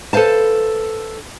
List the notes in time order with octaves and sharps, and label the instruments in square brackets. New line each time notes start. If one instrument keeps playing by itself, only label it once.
[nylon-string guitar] A4 B4 C5 F5 A5